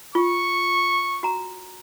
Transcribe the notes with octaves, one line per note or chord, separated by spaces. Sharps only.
F4 C#6
F#4 A#5